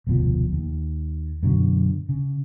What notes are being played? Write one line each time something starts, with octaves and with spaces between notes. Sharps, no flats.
F1 D2 B2 F3
D#2
F#2 B2 D3 F#3
C#3